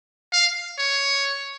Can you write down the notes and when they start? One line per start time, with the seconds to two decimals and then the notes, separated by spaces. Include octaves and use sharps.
0.33 F5
0.79 C#5